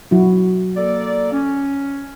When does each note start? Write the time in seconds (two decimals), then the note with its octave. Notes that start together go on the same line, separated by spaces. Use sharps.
0.11 F#3 E4 F#4
0.76 A#3 A4 D5
1.31 C#4